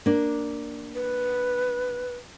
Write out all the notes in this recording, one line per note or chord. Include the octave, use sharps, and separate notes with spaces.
A#3 D4
B4